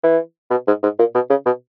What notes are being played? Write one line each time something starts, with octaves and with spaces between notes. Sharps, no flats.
E3
B2
G#2
G#2
A#2
B2
C#3
B2